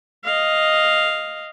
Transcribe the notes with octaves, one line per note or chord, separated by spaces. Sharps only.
D#5 F5